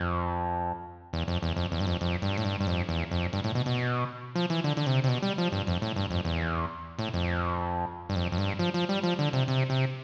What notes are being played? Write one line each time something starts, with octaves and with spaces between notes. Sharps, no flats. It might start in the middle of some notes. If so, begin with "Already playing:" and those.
Already playing: F2
E2
F2
E2
F2
E2
G2
F2
F2
G2
A2
G2
G2
F2
E2
F2
G2
A2
B2
B2
F3
E3
D3
D3
C3
C3
B2
G3
F3
G2
F2
A2
G2
F2
E2
A2
F2
G2
F2
F2
G2
F3
F3
G3
F3
D3
C3
C3
C3